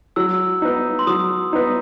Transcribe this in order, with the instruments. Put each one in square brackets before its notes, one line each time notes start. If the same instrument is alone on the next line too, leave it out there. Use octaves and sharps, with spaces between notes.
[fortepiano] F#3 [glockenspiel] E6
[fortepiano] B3 D#4
[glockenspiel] C6
[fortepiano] F#3 [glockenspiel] D#6
[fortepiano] B3 D#4